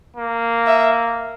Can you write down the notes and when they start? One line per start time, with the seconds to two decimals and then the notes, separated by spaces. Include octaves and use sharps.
0.17 A#3
0.67 E5